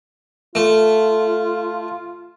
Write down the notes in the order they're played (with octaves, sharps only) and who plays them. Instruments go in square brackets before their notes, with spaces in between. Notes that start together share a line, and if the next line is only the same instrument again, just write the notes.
[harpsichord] A3 [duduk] F4